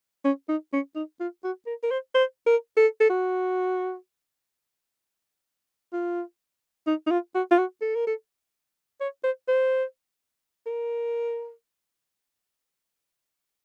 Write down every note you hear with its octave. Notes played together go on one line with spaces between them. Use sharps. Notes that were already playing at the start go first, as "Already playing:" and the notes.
C#4
D#4
C#4
D#4
F4
F#4
A#4
A#4
C5
C5
A#4
A4
A4
F#4
F4
D#4
D#4
F4
F#4
F4
F#4
A4
A#4
A4
C#5
C5
C5
A#4